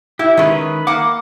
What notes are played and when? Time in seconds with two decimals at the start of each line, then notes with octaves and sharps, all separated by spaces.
0.19 E4 G4
0.37 D#3 G#3 C#4 B4
0.87 A#3 F#5 D6